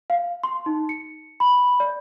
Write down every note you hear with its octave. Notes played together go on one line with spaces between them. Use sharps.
F5
C6
D#4
C#7
B5
D5